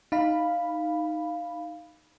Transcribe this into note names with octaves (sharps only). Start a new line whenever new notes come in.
D#4 F5 B5